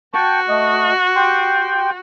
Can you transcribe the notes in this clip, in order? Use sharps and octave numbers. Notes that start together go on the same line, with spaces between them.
F#4 G5 A5 C#6
A3 D#5
G4 G5 C6